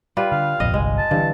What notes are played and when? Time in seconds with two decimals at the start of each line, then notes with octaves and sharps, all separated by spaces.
0.17 G3 F4 B4
0.32 D3 F5
0.60 D1 A#1 F2 D#5
0.74 G1 C2 G#3
0.98 A5
1.11 G2 D3 E3